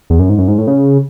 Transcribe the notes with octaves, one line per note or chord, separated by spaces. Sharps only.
E2
F#2
G#2
F#2
G#2
A2
C#3